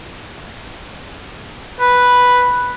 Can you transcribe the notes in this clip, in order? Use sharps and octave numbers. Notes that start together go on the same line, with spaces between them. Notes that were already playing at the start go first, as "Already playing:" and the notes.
B4